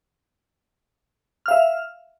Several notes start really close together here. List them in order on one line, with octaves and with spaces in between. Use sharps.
F6 F5 E5